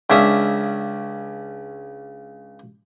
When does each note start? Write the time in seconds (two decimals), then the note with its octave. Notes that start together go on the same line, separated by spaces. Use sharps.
0.10 C#2 C#4 D4 E5 F5 D#6